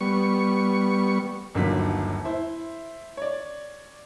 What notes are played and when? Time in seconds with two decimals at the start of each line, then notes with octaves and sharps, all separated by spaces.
0.01 G3 B3 C#6
1.55 G1 D#2 D3 F#3 B6
2.25 E4 C5
3.17 C#5 D5